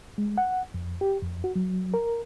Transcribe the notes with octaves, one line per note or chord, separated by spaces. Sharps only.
G#3
F#5
F2
G4
F2
F#4
F#3
A#4